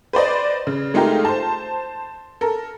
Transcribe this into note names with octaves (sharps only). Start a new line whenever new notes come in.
B4 C5 D5 D#5
C#3
G#3 A3 D#4 F4 G4 A#4
C5 A5
A4 A#4